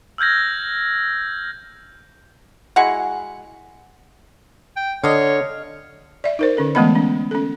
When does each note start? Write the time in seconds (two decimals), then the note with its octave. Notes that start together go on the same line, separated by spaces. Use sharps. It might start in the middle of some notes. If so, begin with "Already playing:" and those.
0.18 E6 F6 G6 G#6 A#6
2.76 G#3 E4 F#4 F#5
4.76 G5
5.04 D3 C#5 D#5 F5
6.24 D5 E5
6.39 D#4 A#4 C5
6.57 D3 C#4 A4
6.75 E3 G#3 A3 B3 D#5 B5
6.95 C#4
7.31 C#4 A4